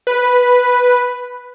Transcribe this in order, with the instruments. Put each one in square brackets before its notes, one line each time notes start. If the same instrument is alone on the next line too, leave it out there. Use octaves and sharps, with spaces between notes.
[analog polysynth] B4